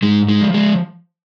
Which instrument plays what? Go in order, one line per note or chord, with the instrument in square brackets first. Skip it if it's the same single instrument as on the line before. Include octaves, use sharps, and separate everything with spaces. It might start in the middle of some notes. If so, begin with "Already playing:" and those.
[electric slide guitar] G#2 G#3
G#3
F3
G#3